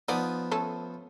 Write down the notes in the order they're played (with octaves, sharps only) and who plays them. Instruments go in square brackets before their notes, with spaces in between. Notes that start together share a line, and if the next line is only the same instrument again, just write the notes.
[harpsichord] F3 B3 D#6 [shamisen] D#4 D5
[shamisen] A3 C#4 A4